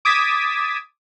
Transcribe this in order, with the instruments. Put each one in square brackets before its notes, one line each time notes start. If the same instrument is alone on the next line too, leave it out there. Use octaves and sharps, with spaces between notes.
[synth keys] D6 D#6 G#6 A6 B6 E7